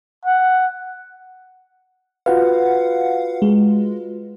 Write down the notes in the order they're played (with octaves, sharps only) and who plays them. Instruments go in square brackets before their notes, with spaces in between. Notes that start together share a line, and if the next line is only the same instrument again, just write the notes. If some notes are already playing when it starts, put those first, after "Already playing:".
[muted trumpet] F#5
[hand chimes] F4 F#4 B4 [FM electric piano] F5 F#5
[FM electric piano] G#3